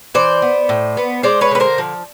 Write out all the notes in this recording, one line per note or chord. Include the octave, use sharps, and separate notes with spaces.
E3 C5 D5
B3
A2
B3
G#3 C5 D5
B4 C#5
D3 B4
A#4 C5
F3